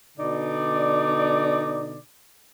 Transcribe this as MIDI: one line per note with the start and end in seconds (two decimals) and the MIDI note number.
0.18 1.98 47
0.18 1.98 50
0.18 1.98 63
0.18 1.98 74